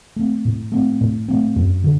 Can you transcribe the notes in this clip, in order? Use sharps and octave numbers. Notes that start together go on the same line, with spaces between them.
A3 C4
A2
A3 C4
A2
A3 C4
F#2
D3